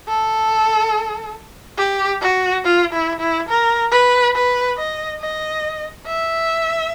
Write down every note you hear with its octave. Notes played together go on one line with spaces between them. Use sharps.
A4
G4
F#4
F4
E4
E4
A#4
B4
B4
D#5
D#5
E5